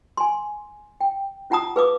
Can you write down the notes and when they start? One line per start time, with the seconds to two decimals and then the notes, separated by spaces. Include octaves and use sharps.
0.17 G#5 A#5 C6
1.01 G5
1.50 C#4 F4 F#5 A5 A#5 D#6
1.76 G#4 B4 F5 D6 D#6